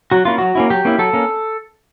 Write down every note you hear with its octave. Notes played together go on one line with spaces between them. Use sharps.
F#3 F#4
A#3 C#4 E4 F4
F#3 F#4
A#3 C#4 E4
F#3 G4
A#3 C#4 E4
F#3 A4
A#3 C#4